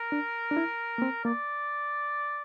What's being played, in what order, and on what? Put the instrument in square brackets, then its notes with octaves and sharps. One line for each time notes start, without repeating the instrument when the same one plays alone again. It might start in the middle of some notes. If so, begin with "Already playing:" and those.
Already playing: [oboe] A#4
[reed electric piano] D4
D4
E4
A#3
C4
[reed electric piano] A#3 [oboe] D5